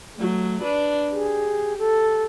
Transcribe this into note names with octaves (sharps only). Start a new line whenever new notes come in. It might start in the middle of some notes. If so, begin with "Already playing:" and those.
F#3 A3
D4 B4
G4 G#4
A4